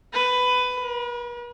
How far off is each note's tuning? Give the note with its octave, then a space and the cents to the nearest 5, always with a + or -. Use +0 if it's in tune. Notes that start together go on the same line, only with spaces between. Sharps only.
B4 +15
B4 -45